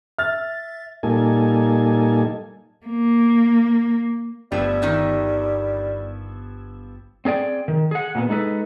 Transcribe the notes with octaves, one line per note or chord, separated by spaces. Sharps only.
E5 F6 A6
A#2 G3 A#3 D#4 A4 G#5
A#3
G1 F3 G3 A3 B3 G4 E6 G#6
D#3 D#4 E5
C4 G#4 D5 G5
D#3
G#4 F#5
A#2 D#3 B3
G#3 D#4 G#4 A4 B4